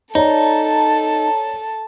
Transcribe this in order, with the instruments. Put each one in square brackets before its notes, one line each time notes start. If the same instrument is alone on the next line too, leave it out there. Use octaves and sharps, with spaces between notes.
[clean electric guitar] D#4 [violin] A4 A5 [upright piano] C#5 D5 A#5